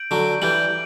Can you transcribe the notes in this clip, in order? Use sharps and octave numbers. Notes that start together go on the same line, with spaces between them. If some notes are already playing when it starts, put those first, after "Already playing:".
Already playing: G6 D7 F#7
D3 F#3
E3 G3 G6 D7 F#7